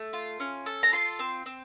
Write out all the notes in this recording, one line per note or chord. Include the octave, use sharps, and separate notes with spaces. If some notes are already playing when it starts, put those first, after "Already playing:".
Already playing: A3
F4
C#4
A4
A#5
F4 C6
C4
C4